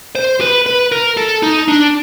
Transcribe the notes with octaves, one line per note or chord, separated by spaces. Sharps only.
C5
B4
B4
A#4
A4
D#4
D4